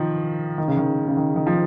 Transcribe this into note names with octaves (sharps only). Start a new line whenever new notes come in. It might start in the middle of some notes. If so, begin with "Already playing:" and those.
Already playing: D#3 F3
D#3
C#3
D#3
C#3
D#3
D#3
F3